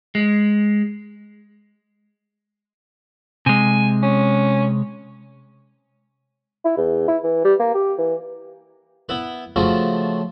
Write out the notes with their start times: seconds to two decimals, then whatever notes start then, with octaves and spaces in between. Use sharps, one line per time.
0.15 G#3
3.46 C3 G#3 G#5
4.03 C#4
6.65 E4
6.77 E2
7.08 E4
7.23 E3
7.45 G3
7.59 A#3
7.74 G4
7.98 E3
9.09 B3 E4 B4
9.56 C#3 F3 A3 F4 F#4